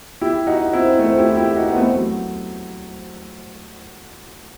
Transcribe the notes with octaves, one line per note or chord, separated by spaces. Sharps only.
E4 G4
D#4 F#4
C4 E4
A3 C4
E4 G4
E4 G4
D#4 F#4
B3
A3 C4
F#3